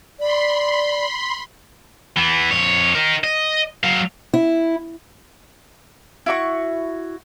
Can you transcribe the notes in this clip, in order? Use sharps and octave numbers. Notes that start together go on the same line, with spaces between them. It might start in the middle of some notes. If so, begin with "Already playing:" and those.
D5 B5 C6
E3 B3
F2 C#5
D#4 A#4
D#5
F#3 F5
E4
E4 F#4 C#6